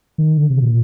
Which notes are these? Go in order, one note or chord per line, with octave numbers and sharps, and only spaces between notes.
D#3
D3
C3
A#2